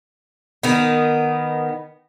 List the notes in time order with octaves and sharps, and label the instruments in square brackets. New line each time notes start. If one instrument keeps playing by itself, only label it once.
[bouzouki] D#3 B3